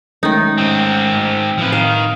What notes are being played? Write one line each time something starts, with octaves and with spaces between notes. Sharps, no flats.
D#3 G#3 A3 C#4 D#4
G#2 C4
A2 F3 C4 B4
D#3 F5